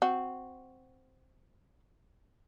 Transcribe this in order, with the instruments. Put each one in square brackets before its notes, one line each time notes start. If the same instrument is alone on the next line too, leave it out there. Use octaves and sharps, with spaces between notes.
[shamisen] C4 F#4